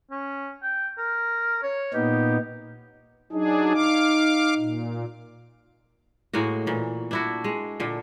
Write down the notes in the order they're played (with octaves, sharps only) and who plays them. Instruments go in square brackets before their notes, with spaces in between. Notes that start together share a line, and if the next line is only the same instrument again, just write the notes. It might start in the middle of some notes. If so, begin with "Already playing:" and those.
[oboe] C#4
G5
A#4
C#5
[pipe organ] A#2 B3 D#4 [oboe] G4
[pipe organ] F#3 D4 G#4 [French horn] D#4
[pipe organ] F5 D6
A#2
[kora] A2 G#3 A#3 F#4
A#2 E3
D4 E4 F#4
G#3
A#2 D3